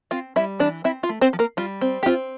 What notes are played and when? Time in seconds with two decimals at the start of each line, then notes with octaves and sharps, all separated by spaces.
0.11 C4 F4 F5
0.36 G3 E4 E5
0.60 E3 D4 D5
0.84 C4 E4 E5
1.03 F4 F5
1.09 A3
1.21 C4 C5
1.33 F3
1.39 A#3 A#4
1.57 G3 F4
1.81 C4
2.03 G4
2.06 C4 F4